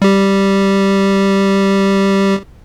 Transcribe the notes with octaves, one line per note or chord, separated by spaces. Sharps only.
G3 G4